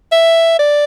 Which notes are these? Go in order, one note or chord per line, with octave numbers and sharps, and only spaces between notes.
E5
D5